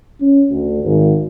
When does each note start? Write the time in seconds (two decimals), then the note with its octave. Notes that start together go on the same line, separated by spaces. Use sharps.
0.20 C#4
0.50 D2
0.83 G#1